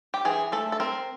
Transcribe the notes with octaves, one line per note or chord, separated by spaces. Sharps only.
G4
E3 G#4
A3 A4
A4
C4 A#4